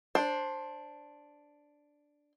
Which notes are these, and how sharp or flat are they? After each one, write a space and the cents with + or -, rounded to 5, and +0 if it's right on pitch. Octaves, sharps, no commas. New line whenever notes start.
D4 +0 C5 +15